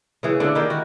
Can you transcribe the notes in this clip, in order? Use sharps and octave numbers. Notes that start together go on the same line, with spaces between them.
C#3 E3 G#4
D3 D4
D#3 A#3 E4 G4
F#4